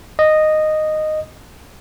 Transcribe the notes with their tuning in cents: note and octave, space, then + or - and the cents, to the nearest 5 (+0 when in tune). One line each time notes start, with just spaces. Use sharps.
D#5 -10